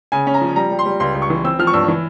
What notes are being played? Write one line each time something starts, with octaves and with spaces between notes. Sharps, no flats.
C#3 G#5
C#4
A#5
F3
G3 A#5
G3
C6
G3
C#2 C6
C#2
C#6
E3
C4 E6
F3 F6
C#6
G2 E6
E3